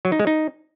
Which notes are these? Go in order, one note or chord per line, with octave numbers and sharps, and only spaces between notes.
F#3
D#4
G#3
D#4